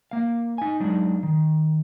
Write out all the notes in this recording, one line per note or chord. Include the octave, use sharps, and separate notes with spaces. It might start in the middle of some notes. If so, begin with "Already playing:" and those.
A#3 F5
D#4 G#5
F#3 G#3 D4 D#4
D#3